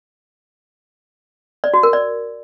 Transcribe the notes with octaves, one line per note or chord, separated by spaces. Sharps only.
D5
F#4
A#4
D5